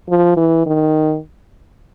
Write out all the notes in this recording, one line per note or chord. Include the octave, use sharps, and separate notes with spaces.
F3
E3
D#3